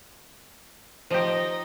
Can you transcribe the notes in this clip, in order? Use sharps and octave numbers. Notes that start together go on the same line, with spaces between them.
F3 D#4 G4 D#5